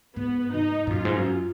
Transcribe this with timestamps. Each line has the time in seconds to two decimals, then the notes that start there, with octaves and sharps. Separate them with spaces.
0.16 G#2 B3
0.54 G#2 D#4
0.87 G#2
0.90 F#2 F4
1.05 G#2
1.16 F#2